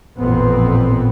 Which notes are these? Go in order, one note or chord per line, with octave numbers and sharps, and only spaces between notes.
A1 F2 A#2 B3 C4